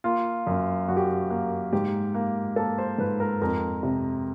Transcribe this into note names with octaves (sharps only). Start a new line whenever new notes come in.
A#3 F4
F#2
F#2 F#4
G4
F#4
A#3
G#2 G4
A#3
A#3 A4
C5
G#2 B4
A#4
F2 A#4
C3